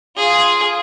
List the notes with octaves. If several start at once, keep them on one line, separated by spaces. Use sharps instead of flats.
F4 G#4